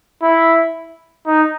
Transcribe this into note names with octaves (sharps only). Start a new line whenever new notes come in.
E4
D#4